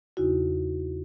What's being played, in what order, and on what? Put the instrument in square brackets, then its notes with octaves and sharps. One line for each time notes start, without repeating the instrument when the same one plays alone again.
[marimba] E2 C#3 D#4 E4 F#4